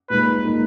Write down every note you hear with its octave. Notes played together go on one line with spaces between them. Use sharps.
A#2 G#3 D#4 A#4 B4
A#2 G#3 D#4 A#4